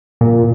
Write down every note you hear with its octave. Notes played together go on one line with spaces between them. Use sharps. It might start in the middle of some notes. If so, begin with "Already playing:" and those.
A#2